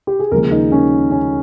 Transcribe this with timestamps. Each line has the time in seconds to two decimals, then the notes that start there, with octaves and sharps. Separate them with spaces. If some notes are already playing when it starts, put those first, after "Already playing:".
0.07 G4
0.20 G#4
0.31 D#2 C#3 F3 G#3 A#4
0.51 D#4
0.72 C#4
1.11 C#4